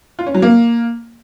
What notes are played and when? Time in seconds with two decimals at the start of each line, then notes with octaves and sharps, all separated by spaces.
0.19 F4
0.27 C#4
0.34 F#3
0.42 A#3